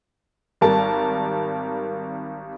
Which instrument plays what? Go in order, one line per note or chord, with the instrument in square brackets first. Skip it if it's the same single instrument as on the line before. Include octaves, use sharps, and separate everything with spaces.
[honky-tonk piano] G#1 G3 A#4 A5